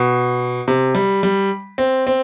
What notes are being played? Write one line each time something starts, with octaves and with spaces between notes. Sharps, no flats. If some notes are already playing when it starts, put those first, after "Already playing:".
Already playing: B2
C3
G3
G3
C4
C4